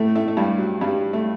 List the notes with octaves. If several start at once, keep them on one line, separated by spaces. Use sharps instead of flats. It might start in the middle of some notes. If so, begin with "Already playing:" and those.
Already playing: A2 A3
A2 A3
A3
G2 G3
F#3
G2 G3
A3